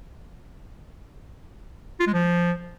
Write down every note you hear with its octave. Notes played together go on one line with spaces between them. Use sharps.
F4
G#3
F3